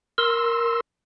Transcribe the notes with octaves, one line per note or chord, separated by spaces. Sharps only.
A#4 C6 E6